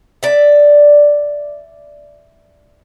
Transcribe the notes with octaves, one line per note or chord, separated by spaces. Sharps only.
D5 E5